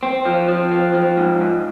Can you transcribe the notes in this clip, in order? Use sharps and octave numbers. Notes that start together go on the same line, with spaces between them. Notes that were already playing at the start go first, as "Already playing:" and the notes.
C4
F3
F3
C4
F3
G#2
G#2